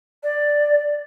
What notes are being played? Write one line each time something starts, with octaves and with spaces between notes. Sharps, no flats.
D5